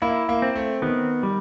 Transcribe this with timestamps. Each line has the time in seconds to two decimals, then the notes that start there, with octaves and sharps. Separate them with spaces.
0.02 A#3 E4
0.29 A#3
0.42 C4
0.55 A3
0.82 D#3 B3
1.23 G3